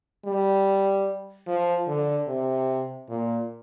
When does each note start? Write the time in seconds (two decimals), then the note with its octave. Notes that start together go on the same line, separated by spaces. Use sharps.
0.25 G3
1.47 F3
1.88 D3
2.28 C3
3.09 A#2